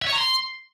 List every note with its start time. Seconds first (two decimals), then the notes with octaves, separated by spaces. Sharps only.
0.02 E5
0.07 C#5
0.13 A#5
0.18 C6